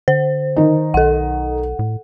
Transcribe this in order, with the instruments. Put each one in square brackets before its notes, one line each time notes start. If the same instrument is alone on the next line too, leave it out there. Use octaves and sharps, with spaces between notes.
[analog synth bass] D3 [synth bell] C5
[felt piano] D#3 D#4
[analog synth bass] B1 [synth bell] A4 F#5
[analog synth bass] A2